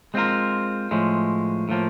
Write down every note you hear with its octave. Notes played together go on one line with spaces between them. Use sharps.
G#3 C4 F4 A#4
A2 F3 G#3
A2 F3 A#3